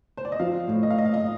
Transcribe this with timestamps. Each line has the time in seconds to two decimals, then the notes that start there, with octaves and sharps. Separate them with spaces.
0.17 C5
0.25 D5
0.32 D#5
0.40 F3 F5
0.68 A2
0.83 D#5
0.90 F5
0.96 A2 D#5
1.06 F5
1.14 D#5